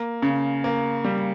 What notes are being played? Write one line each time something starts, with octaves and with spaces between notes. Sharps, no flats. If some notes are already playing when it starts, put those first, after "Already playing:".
Already playing: A#3
C#3
A#3
G3